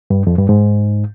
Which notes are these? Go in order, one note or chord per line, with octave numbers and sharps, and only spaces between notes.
G2
F2
G2
G#2